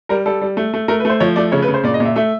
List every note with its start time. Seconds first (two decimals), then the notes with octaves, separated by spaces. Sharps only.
0.09 G3 A#4
0.26 G3 A4
0.41 G3
0.57 A3
0.74 A3
0.88 A3 A#4
1.00 B4
1.05 A3 C5
1.20 F3 C#5
1.36 A3 D5
1.52 C#3 C#5
1.62 B4
1.68 C#3
1.74 C5
1.84 A#2 D5
1.94 D#5
2.00 A#2
2.05 E5
2.16 A3 E5